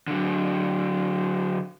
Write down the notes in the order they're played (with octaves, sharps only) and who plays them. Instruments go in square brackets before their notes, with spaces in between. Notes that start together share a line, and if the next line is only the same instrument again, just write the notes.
[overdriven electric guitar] D3 F#3